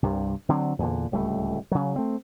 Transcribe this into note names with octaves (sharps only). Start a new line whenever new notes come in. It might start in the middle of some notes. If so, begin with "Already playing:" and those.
C2 G2 C3
D3 F#3 C4
E2 A#2 D3
D1 C#2 G3 A3
C#3 F#3
A3 C4